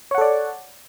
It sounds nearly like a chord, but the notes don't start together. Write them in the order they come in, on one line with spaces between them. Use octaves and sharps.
C#5 F#5 A4 D5